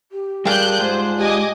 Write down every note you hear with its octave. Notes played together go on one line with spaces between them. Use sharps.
G4
G3 D4 F4 G#4 A#4 G5 F#6 G6
G#2 C5
G4 D#5 G#5 D6